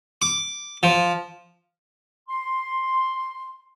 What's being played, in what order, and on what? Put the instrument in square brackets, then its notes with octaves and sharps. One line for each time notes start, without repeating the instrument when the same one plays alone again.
[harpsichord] D6
F3
[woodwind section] C6